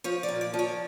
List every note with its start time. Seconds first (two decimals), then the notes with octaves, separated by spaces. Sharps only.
0.04 F3 C#5
0.23 D5
0.28 A#2
0.41 D5
0.54 F3
0.59 C#5